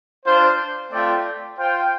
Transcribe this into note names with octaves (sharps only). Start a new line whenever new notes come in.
D4 F4 C5
A3 C4 F4 D5 G5
F4 C5 G5